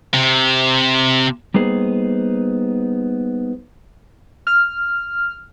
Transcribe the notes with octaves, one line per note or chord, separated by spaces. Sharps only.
C3
G3 A#3 B3 D#4 G#4 C5
F6